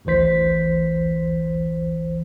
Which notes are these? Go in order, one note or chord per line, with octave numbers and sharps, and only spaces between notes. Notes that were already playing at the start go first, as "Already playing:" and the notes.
A1 D2 E3 C5 B6